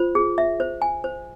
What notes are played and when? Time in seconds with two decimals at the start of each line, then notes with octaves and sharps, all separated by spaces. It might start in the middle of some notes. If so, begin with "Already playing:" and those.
Already playing: F4 C5
0.15 G#4
0.38 E5
0.60 C5
0.82 G#5
1.04 C5